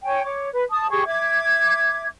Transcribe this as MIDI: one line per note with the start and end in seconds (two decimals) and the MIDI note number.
0.03 0.21 73
0.03 0.21 79
0.03 0.21 80
0.22 0.45 73
0.22 0.45 86
0.51 0.62 71
0.70 0.88 81
0.70 0.88 87
0.90 1.05 67
0.90 1.05 68
0.90 1.05 85
1.06 2.05 76
1.06 2.05 86
1.06 2.05 92